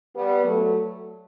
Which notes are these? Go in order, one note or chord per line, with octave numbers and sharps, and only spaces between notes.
G3 B3
F#3 A3